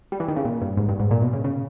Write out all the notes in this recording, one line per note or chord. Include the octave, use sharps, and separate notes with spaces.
G3
E3
D#3
C#3
A#2
G2
G#2
G2
G#2
A#2
B2
C#3
C#3